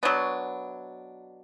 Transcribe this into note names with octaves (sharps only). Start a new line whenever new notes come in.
B2 F#3 B3 D4